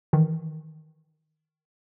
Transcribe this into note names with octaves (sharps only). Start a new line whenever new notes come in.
D#3 E3